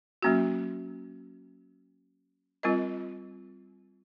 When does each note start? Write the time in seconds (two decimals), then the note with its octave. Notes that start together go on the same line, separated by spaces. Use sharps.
0.23 F#3 A#3 C#4 F#4
2.63 G3 C4 F4 A#4 D#5